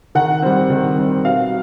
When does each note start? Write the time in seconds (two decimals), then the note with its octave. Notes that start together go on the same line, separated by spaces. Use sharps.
0.15 D#3 F#5
0.42 G3 C4
0.70 D#3
0.98 G3 C4
1.25 B2 F5